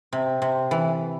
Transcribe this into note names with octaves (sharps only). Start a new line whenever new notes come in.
C3
C3
E3